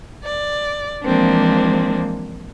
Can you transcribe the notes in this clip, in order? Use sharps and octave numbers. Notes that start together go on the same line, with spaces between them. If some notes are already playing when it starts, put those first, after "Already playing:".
D5
E3 F3 G#3 A#3 C4 D4